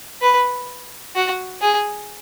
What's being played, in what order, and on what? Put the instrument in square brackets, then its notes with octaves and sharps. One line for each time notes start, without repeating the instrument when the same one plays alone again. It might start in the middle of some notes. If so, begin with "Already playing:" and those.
[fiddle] B4
F#4
G#4